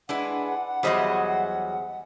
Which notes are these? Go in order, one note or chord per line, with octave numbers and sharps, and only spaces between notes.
G#3 D4 E4 B4 F#5
E2 F#3 G3 G#4 C5 D#5